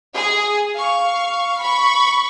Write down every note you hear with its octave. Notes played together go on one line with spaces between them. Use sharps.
G#4
F5 C#6
B5 C#6